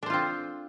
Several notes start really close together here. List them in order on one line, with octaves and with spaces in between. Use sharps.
D4 C5 F4 C4